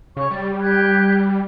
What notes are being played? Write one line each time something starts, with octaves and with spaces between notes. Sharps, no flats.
C#3 C#5 C#6
G3 D5
G4 F#6 G#6